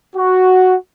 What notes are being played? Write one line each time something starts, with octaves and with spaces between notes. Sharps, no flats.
F#4